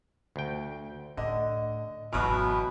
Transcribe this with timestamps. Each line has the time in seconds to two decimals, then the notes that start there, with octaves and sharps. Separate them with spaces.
0.36 D2 G5
1.17 A2 D3 D#5
2.13 G#1 B2 E3 F#3 B3 B5 F6